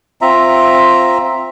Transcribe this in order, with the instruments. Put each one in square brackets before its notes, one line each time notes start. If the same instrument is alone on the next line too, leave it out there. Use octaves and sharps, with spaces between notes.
[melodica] C4 F4 E5 A#5